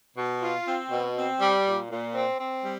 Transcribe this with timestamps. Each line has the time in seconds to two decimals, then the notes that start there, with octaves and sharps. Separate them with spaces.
0.16 B2
0.41 F4
0.66 C4
0.90 B2
1.16 C4
1.40 G3
1.65 A#2
1.89 A#2
2.14 C4
2.39 C4
2.64 G3